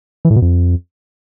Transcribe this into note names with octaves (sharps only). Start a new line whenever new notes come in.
E3
A2
B2
F2